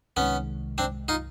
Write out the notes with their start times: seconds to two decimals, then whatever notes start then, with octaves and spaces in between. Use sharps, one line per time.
0.16 C2 C3 D#3 G#3 B3 C#4
0.78 C4 D4
1.08 D#4 F4